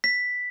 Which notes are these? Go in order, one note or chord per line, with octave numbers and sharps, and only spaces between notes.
B6